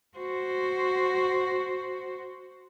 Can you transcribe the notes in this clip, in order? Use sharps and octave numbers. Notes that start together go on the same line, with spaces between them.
F#4 C5